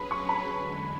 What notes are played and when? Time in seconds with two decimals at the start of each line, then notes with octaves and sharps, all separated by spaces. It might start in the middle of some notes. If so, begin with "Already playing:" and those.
Already playing: F#3 C#4 G#4 B4 B5
0.11 C#6
0.29 B5
0.47 E2 D3 G#3